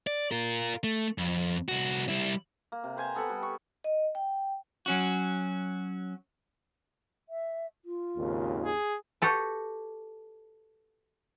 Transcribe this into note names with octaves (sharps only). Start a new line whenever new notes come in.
D5
F4 A#4
A3
F2
C2 F#4
G3 E4
A#3
C3
B4 C5 G#5 A#5
B3 A4 F#5 B5
G3
C#6
D#5
G5
F#3 C#4 F#4
E5
F4
G#1 D#2 C#3
G#4
F#4 G4 A4 B4